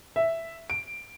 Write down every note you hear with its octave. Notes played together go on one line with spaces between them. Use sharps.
E5
D7